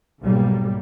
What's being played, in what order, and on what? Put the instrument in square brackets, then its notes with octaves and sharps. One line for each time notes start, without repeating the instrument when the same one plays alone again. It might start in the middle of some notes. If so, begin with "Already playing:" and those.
[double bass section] B1 G#2 G3 A#3